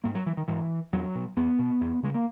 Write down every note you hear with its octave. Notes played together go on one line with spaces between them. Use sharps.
G#2 A#3
F#3
E3
D#3
G#2 E3
E2 F#3
B2
E2 B3
B2
E2
C#3 G#3
A#3